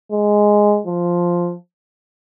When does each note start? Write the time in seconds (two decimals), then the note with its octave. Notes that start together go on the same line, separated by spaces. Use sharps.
0.12 G#3
0.87 F3